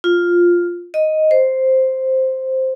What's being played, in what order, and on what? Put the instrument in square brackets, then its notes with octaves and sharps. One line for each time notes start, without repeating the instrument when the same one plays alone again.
[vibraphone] F4
D#5
C5